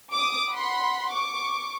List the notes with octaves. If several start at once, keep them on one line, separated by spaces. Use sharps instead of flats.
D6 D#6
F#5 B5 C6
C#6 D6